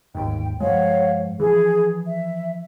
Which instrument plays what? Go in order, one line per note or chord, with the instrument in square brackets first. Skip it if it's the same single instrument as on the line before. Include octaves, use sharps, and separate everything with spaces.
[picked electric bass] G1 D#2 G#2 [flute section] G5
[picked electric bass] G2 F3 G#3 [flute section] C#5 F5 F#5
[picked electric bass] E3 F3 [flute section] G#4
[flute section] E5